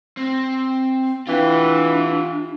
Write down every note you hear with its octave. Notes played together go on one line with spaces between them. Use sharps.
C4
E3 D4 F4 G4